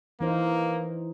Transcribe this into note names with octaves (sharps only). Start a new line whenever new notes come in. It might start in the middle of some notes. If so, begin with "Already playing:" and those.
E3 A#3 D#4 C5